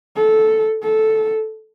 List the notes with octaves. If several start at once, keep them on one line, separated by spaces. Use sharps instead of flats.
A4
A4